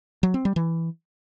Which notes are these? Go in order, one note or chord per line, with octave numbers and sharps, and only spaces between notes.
F#3
C4
G3
E3